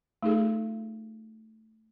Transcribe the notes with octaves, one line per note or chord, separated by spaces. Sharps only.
A3 D#4 F4 G#4 A4